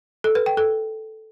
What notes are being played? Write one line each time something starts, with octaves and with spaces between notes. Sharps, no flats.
A4
B4
G5
A4